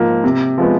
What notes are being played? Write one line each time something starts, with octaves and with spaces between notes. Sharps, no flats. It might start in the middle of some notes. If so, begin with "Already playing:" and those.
Already playing: G#2 F3 A#3
C3
F3 G#3 B3